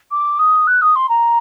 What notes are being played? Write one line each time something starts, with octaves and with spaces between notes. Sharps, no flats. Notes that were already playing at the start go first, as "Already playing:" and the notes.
D6
D#6
F#6
D#6
C6
A#5